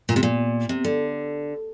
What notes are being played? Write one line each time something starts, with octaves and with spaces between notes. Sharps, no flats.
A#2
C3
A#2
C3
D3